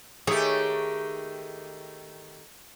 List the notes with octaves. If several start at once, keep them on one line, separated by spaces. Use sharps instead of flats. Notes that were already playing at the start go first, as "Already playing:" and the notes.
D#3 A3 G4 G#4 C#5